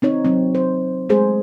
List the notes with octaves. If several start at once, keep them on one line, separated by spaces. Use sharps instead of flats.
C4 D#4 C#5
F#3 C4
C5
G#3 A3 G#4 C5